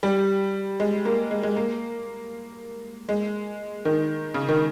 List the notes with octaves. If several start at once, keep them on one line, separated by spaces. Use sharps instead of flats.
G3
G#3
A#3
G#3
G#3
A#3
G#3
D#3
C#3
D#3